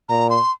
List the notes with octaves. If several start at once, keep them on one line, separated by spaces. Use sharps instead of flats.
A#2 A#5
C6